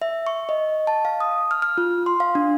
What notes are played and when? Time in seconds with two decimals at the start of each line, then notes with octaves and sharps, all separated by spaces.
0.02 E5
0.27 C#6
0.49 D#5
0.87 A5
1.05 F5
1.20 D#6
1.51 F6
1.62 F6
1.78 F4
2.06 C6
2.20 F5
2.35 D4